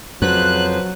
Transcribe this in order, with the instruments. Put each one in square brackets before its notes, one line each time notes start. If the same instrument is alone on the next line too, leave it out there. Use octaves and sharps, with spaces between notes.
[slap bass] F2 [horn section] C#3 B4 C5 [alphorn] F#3 [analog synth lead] F#6